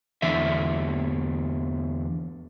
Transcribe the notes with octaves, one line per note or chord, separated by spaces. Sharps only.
E2 D3 E5